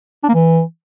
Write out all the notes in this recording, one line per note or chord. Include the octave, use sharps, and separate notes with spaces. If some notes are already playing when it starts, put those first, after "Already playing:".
D4
A#3
E3